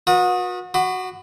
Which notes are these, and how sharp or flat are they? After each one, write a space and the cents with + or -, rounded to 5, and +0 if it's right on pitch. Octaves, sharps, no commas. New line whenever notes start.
F#4 -35 B4 -40 D#6 +0
F#4 +0 B5 +30 D6 +45